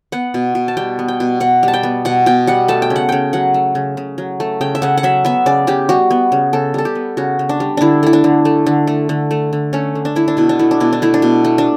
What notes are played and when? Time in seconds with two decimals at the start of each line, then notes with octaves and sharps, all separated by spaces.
0.12 B3 F#5
0.34 B2
0.55 B2
0.68 A5
0.77 G3 G5
0.99 B3
1.08 G5
1.20 B2
1.40 B2 F#5
1.63 G3
1.68 A5
1.74 G5
1.83 B3
2.05 B2 F#5
2.26 B2 G5
2.47 G3 F#5
2.68 A3 A5
2.82 G5
2.90 C#3
2.96 F#5
3.09 C#3 G5
3.33 F#3 F#5
3.54 A3
3.75 C#3
3.97 C#3
4.18 F#3
4.40 A3
4.61 C#3 G5
4.75 E5
4.82 C#3 F#5
4.97 F#5
5.03 F#3 E5
5.25 B3 E5
5.46 C#3 D5
5.67 C#3 G4
5.89 G3 F#4
6.11 B3
6.32 C#3
6.53 C#3 A4
6.74 G3 A4
6.85 G4
6.95 B3
7.17 C#3 F#4
7.39 C#3
7.49 D4
7.60 G3
7.77 D3 D4 E4
8.03 A3 E4
8.13 D4
8.24 D3
8.45 A3
8.66 D3
8.87 A3
9.09 D3
9.31 A3
9.53 D3
9.73 A3 C#4
9.95 D3
10.05 D4
10.16 A3 E4
10.28 D4
10.37 B2 E4
10.49 D4
10.59 A3 E4
10.71 D4
10.80 B2 E4
10.93 D4
11.02 A3 E4
11.14 D4
11.22 B2
11.45 A3
11.58 D4